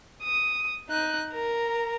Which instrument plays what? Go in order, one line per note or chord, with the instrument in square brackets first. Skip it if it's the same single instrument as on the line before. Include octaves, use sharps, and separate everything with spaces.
[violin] D#6
D#4 F#6
A#4 A#5